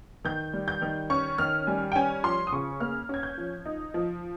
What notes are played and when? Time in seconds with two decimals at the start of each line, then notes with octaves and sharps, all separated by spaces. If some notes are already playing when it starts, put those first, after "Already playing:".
0.25 D#3 G6
0.54 G3
0.68 G6
0.82 D#3
1.10 C#4 C#6
1.38 D#3 F6
1.67 G3 G#5
1.92 G5
1.95 C#4 G#5
2.23 F3 C6
2.47 D#6
2.52 C#3 C#6
2.80 A#3 F6
3.09 C#4 G#6
3.23 G6
3.38 F3
3.65 D#4
3.94 F3